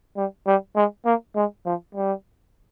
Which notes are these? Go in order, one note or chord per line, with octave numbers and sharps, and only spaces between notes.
G3
G3
G#3
A#3
G#3
F3
G3